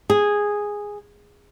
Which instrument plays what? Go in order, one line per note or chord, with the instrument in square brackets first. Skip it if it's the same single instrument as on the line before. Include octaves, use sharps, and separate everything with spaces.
[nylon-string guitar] G#4